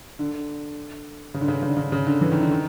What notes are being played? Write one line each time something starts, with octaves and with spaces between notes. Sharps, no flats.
D3
C#3
D3
C#3
D3
C#3
D3
C#3
C#3
D3
E3
D#3
D3
D#3